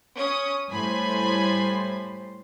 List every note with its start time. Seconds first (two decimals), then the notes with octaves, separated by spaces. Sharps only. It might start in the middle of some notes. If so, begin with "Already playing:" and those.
0.16 C#4 D#6
0.70 A2 G3 C5 G#5 B5